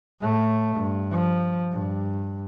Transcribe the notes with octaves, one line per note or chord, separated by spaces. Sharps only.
A2 A3
G2
F3
G2